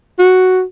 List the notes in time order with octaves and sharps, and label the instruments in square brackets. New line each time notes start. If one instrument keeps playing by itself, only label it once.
[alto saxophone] F#4